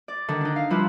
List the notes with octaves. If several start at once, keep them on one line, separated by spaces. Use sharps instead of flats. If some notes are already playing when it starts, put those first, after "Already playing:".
D5
D3 D#3
D4 D#4
F5
F3 G3 E4 F4 B4